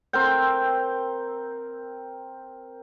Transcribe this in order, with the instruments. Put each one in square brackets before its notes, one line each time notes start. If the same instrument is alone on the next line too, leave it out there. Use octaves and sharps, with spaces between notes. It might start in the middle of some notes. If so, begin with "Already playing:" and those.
[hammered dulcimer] C4 A#4 G5